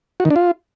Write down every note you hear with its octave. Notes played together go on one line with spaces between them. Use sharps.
F#4
D#3
D4
F4